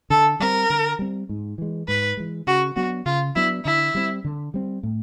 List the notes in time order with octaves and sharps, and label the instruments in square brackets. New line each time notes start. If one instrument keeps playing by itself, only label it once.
[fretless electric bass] D3 [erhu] A4
[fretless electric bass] G3 C4 [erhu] A#4
[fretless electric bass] D3
G3 C4
G#2
E3 G#3
[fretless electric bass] G#2 [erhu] B4
[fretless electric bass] E3 G#3
[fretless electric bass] C#3 [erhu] F#4
[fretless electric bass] F#3 B3 D4 [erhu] F#4
[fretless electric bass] C#3 [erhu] F4
[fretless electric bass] F#3 B3 D4 [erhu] E4
[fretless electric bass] D3 [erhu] E4
[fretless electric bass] G3 C4
D3
G3 C4
A2